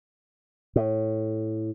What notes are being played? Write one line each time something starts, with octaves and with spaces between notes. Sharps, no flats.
A2